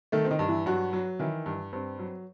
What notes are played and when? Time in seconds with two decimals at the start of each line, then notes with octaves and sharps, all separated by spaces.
0.12 D#3 A3 A4
0.25 C4
0.31 D#3 D#4
0.39 G2
0.48 E3 E4
0.66 G2 F#3 F#4
0.93 F#3
1.19 D#3 E3 E4
1.46 G2
1.73 G2 C4
1.99 F#3